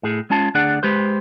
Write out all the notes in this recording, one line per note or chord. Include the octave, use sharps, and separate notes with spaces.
A2 G#4
G#3 C#4 F4 A5
D2 D4 G#4 D5 F#5
G#3 G4 B4 C5